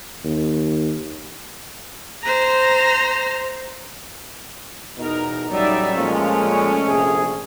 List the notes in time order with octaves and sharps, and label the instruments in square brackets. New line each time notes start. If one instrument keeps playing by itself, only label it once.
[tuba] D#2
[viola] C5 A#5
[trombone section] E2 B2 D#4 [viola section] A#4
[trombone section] A1 F#3 G3 [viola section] D#4 D5 E5
[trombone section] A#2 F3 G#3 [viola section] A3 C#4
[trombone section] A#1 C3 G#4